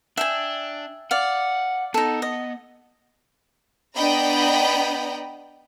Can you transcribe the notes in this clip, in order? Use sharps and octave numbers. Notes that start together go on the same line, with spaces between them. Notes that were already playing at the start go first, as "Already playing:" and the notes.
D4 E5 G5 G#5
D5 F5 F#5
B3 D#4 A4
D#5
B3 D4 D#5 G5 A#5 B5